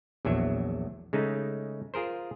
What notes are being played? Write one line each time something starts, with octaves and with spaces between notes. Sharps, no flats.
A#1 E2 F#3 E5
C#3 G#3 A3 D#4
F4 G#4 A#4 C5